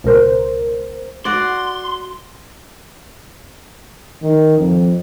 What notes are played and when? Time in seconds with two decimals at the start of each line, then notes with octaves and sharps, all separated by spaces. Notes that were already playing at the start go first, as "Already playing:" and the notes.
0.04 C#2 B2 A#4 C5
1.25 F#4 D5 C6
4.22 D#3
4.58 F2